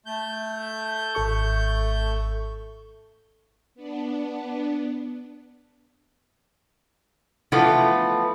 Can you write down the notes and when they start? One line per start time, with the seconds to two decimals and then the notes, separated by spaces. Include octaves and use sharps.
0.06 A3 G6
1.15 G#1 A4 C#6
3.75 B3 D4
7.52 E3 F3 A3 B3